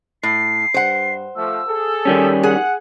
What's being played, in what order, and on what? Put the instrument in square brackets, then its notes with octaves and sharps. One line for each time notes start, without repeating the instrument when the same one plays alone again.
[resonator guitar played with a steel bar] A2 [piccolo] C7
[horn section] G2 [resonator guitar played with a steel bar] C5 F#5
[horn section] F3 A3 [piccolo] E6
[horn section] G#4 A4
[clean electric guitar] D#3 G3 C#4
[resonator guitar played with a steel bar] G#4 [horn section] F#5